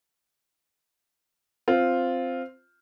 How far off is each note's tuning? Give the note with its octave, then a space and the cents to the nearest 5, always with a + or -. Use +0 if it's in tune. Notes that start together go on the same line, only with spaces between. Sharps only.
C4 +0 F4 +0